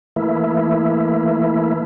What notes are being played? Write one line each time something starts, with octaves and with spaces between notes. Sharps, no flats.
E3 A3 A#3 E4